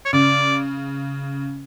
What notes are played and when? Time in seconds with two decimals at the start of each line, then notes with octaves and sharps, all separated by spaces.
0.05 C#5
0.13 C#3 D5